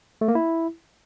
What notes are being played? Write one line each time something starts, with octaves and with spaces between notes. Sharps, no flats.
A3
A#3
E4